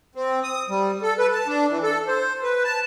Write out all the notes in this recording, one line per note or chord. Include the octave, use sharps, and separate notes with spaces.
C4
D#6
G3
A4
B4
A5
D4
E3
A4
C5
B4
A5